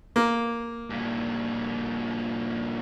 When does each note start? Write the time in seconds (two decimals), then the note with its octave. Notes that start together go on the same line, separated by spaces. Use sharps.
0.16 A#3
0.90 G2 A#2